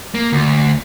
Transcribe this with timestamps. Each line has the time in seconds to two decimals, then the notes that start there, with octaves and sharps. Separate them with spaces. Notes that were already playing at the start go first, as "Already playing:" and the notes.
0.15 A#3
0.32 D2